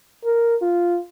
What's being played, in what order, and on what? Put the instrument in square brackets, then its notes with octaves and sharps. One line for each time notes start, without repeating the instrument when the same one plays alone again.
[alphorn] A#4
F4